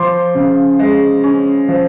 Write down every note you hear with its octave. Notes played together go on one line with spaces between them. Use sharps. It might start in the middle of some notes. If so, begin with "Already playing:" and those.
Already playing: F3 C6 D6
C#3
G#3
C#4
F3